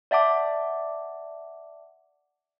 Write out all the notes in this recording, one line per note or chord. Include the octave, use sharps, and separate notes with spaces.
D5 E5 F#5 A5 D6